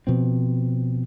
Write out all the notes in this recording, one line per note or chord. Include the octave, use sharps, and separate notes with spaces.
B2 F3 C4